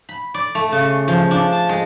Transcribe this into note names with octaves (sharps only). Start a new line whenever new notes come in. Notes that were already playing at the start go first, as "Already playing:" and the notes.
B5
D5
A3
C#3
F3
D4
A5
G#3